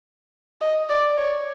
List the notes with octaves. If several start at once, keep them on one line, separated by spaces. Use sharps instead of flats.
D#5
D5
C#5